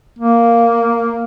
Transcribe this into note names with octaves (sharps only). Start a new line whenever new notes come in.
A#3